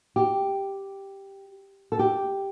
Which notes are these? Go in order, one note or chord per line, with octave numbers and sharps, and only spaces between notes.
G4
A4
G4